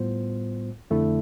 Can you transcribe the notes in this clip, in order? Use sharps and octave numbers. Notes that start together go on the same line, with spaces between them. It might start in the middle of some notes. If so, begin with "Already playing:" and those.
Already playing: A2 G3 B3 F4 C5
F2 D3 A3 E4